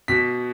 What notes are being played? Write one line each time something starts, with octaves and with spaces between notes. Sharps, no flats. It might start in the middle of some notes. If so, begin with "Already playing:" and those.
B2 B6